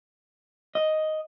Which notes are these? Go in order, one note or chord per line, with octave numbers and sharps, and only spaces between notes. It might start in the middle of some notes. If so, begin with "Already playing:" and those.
D#5